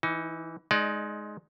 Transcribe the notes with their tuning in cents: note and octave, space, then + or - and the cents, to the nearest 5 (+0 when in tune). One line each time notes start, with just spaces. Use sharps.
E3 +0 D#4 +25
G#3 +20 D#4 +0 D5 +15